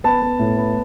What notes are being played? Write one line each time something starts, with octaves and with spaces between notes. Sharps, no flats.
B3 A5
B3
A2
B3